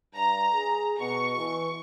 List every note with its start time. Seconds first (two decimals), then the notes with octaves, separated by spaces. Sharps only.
0.14 G2 A#5
0.53 G#4
0.99 B2 C#6
1.36 E3